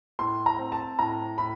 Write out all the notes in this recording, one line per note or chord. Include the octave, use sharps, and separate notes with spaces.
A2 C6
A#5
C4
A5
A2 A#5
A2 B5